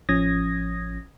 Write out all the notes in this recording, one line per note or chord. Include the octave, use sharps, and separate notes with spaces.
A1 F3 C#4 D#6 G#6 A#6